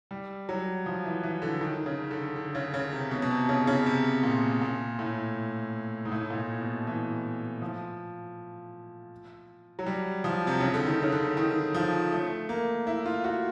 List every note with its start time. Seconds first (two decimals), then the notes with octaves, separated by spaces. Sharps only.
0.11 G3
0.49 F#3
0.86 F3
1.05 E3
1.23 E3
1.42 D3
1.61 D#3
1.86 C#3
2.11 D3
2.36 D3
2.55 C#3
2.74 C#3
2.92 C3
3.11 B2
3.22 B2
3.30 C3
3.49 C#3
3.67 C#3
3.86 C3
4.23 A#2
4.62 A#2
4.99 A2
6.05 G#2
6.12 A2
6.30 A#2
6.36 A2
6.61 B2
6.87 E3
7.62 F3
9.79 F#3
9.86 G3
10.24 F3
10.47 C3
10.60 C#3
10.74 D3
10.87 D#3
11.03 C#3
11.12 D3
11.37 D#3
11.74 F3
12.12 A3
12.49 A#3
12.87 E4
13.06 F4
13.24 F#4